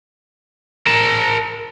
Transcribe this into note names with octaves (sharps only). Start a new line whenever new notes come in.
A#4 A5